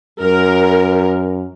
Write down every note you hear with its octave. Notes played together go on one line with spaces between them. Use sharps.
F#2 A#4